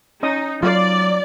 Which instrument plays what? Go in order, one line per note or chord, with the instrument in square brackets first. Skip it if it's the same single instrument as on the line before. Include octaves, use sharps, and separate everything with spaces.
[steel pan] C#4 D#5 D#6 [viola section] D#4
[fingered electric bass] F#3 [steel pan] F4 F5 [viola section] D5